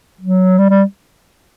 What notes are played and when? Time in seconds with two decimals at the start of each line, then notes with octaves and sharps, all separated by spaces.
0.21 F#3
0.58 G3
0.70 G3